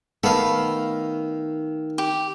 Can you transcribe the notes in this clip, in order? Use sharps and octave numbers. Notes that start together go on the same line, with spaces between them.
D#3 A3 B3 E5 F5
G4